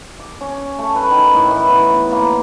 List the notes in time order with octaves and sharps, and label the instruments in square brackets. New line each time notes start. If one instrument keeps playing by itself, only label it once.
[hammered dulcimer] D6
C#4
A3
B4
D#3
A2
E3
B3
A#3